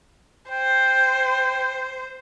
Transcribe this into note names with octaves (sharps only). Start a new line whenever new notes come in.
C5 G5